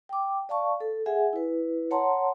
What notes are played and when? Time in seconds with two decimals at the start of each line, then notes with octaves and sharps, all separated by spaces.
0.09 G5 D6
0.49 D5 F5 A5 C#6
0.80 A4
1.06 G#4 E5 F#5 G#5
1.33 E4 B4
1.91 C#5 F#5 A5 A#5 C6